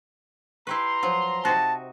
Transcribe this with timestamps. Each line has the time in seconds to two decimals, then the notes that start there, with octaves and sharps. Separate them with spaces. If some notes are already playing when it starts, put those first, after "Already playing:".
0.67 E4 G4 B4 A#5 C6
1.03 F3 F#3
1.45 C3 D#4 F#4 A5